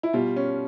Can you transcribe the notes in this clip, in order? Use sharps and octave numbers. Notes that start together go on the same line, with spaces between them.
E4
B2 G3 F4
C#4